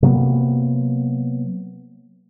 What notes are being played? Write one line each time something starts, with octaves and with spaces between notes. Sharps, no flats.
C3 F#3 A#3 B3